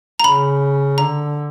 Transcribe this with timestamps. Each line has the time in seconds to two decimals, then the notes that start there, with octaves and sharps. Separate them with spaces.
0.20 A#5
0.24 C#3 B5
0.98 D3 A#5